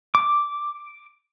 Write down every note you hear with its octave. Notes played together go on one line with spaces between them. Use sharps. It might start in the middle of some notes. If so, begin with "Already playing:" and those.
D6